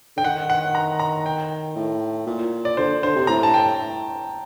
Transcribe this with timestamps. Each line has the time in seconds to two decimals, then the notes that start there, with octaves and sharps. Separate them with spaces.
0.16 D3 G5
0.24 D#3 F#5
0.50 F#5
0.75 A#5
1.00 A#5
1.26 G5
1.76 A2
2.27 A#2
2.65 D5
2.77 D3 C5
3.02 D3 C5
3.16 C3
3.27 A2 A#5
3.43 A5
3.54 G5